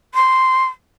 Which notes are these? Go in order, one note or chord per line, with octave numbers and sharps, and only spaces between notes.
C6